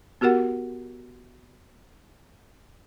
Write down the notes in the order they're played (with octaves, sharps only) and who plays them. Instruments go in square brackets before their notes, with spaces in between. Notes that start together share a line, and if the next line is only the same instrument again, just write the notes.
[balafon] B3 F#4 G4 A#4 F#5